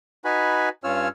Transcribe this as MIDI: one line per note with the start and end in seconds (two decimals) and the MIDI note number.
0.25 0.69 63
0.25 0.69 66
0.25 0.69 71
0.25 0.69 80
0.25 0.69 83
0.84 1.08 43
0.84 1.08 61
0.84 1.08 65
0.84 1.08 73
0.84 1.08 88
0.84 1.08 89